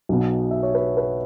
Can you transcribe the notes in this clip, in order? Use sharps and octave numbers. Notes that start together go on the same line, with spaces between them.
B1 B2 B3
E5
C#5
B4
B4